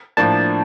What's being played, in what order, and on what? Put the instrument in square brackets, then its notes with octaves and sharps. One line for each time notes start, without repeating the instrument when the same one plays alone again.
[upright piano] A2 F3 A#3 D4 [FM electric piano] A5